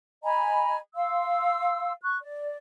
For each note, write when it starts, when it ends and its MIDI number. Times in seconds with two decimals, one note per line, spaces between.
0.23 0.78 75
0.23 0.78 80
0.23 0.78 82
0.23 0.78 83
0.95 1.93 77
0.95 1.93 84
0.95 1.93 88
2.02 2.16 85
2.02 2.16 90
2.20 2.57 74